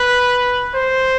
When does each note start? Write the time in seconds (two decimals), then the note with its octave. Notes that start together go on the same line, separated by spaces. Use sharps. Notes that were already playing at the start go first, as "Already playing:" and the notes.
Already playing: B4
0.75 C5